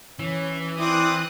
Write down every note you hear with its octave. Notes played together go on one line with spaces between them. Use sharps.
E3 C#4
C4 E4 D5 D#6 F#6